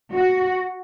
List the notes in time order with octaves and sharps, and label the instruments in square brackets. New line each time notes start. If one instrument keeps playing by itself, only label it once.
[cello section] F#4